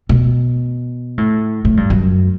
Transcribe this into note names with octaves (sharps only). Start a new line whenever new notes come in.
B2
A2
A2
G2
F#2